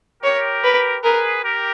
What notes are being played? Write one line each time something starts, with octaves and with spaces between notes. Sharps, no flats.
G4 A#4 C#5
B4
G#4 A#4 B4
G4 A#4